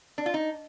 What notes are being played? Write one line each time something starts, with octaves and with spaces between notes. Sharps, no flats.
D4
F4
D#4